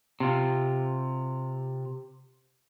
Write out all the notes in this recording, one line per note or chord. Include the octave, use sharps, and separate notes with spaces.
C3 F4